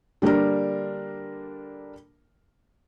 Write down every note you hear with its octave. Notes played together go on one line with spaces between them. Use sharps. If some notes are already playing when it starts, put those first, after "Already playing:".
D3 G3 A#3 D4 A#4